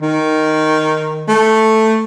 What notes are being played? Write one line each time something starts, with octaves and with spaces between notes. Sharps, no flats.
D#3
A3